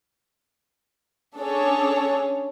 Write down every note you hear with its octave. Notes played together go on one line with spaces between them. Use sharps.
C#4 D4 G#4 A4 C#5